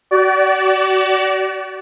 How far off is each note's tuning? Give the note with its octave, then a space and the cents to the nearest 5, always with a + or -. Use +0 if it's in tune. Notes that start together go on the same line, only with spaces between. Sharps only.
F#4 +35 D5 -15